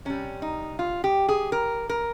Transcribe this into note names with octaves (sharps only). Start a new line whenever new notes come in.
C3 G3 C#4
D#4
F4
G4
G#4
A#4
A#4